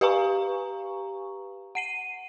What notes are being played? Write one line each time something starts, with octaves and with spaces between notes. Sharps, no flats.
G4 B4 F5 G#5 A#5 C#6
F#5 C7 D#7